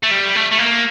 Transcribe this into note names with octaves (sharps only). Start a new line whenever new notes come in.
A3
G3
A3
A3
A#3